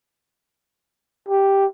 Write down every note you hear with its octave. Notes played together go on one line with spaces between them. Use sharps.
G4